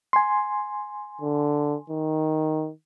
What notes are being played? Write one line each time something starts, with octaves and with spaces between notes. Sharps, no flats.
G#5 C6
D3
D#3